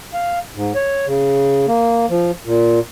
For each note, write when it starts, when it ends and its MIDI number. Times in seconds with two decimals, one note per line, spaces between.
0.13 0.39 77
0.56 0.73 44
0.75 1.06 73
1.07 1.66 49
1.67 2.06 58
2.09 2.31 53
2.45 2.80 46